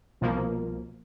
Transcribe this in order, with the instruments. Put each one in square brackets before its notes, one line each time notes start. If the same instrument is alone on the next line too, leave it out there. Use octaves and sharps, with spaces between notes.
[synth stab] C2 B2 F3 A#3